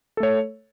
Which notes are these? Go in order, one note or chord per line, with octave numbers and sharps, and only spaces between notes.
A3 A4 C#5